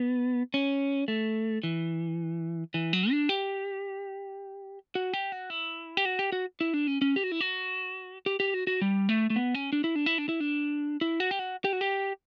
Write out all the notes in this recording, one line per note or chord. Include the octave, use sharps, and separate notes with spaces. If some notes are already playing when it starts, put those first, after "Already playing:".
Already playing: B3
C#4
A3
E3
E3
F#3
D4
G4
F#4
G4
F#4
E4
G4
F#4
G4
F#4
E4
D4
C#4
C#4
G4
F#4
E4
F#4
G4
G4
F#4
F#4
G3
A3
A3
B3
C#4
D4
E4
D4
E4
D4
E4
D4
E4
F#4
G4
F#4
G4
F#4
G4